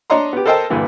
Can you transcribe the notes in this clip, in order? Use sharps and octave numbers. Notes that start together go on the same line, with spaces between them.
D4 C#5 D#5 A#5 C6
B3 G4
A4 A#4 C5 D#5 G5 A5
G2 A#2 D3 E3